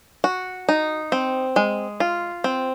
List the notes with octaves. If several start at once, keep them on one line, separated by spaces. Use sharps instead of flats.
F#4
D#4
C4
G#3
F4
C4